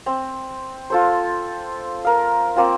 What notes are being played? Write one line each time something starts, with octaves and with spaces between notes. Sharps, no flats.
C4
F4 A4 C5
A#4 F5
A#3 C4 F4